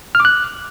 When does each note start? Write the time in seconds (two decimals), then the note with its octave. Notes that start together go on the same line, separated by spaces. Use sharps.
0.15 F6
0.20 D6
0.25 F#6